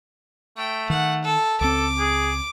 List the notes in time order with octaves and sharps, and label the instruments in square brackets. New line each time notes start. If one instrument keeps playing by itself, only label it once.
[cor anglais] A3 [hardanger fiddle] G5
[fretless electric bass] D#3 [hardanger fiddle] F#5
[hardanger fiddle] A4
[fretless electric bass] C#2 C4 [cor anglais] A4 [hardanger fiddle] D6
[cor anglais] G#4